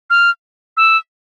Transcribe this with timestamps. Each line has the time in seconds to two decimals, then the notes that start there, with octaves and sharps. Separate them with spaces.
0.10 F6
0.77 E6